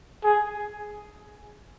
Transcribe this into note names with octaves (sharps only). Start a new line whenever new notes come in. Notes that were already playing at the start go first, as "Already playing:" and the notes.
G#4